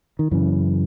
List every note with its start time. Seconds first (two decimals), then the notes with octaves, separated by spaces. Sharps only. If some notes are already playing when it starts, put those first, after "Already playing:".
0.19 D#3
0.31 F#2 C#3 E3